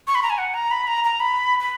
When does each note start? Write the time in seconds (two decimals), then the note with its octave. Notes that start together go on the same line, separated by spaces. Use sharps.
0.07 C#6
0.15 B5
0.23 A#5
0.30 G#5
0.38 F#5
0.54 A#5
0.71 B5
0.87 A#5
1.04 A#5
1.20 B5
1.60 B5